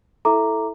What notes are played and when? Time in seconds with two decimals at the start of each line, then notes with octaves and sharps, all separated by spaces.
0.25 E4 A4 E5 A#5 D6